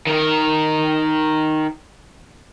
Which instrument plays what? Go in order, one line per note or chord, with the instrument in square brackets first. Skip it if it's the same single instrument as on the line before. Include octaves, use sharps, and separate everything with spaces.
[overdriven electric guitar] D#3 A#4